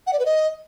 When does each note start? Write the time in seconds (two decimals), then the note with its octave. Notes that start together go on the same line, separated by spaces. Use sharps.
0.07 F#5
0.13 D5
0.19 B4
0.26 D#5